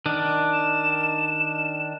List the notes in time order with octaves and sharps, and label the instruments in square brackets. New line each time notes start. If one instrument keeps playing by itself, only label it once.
[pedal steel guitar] D#3 D4
[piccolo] E7